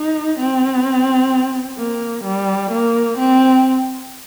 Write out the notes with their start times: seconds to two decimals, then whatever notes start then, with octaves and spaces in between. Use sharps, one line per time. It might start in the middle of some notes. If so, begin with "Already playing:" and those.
Already playing: D#4
0.39 C4
1.78 A#3
2.24 G3
2.72 A#3
3.18 C4